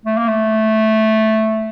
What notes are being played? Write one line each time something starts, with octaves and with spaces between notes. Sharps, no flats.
A3
A#3
A3